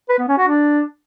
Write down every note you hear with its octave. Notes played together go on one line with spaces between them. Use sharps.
B4
B3
C#4
F#4
D4